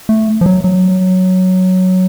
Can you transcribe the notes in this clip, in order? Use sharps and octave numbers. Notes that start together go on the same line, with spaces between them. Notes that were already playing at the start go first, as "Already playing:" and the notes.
A3
F3
F#3
F#3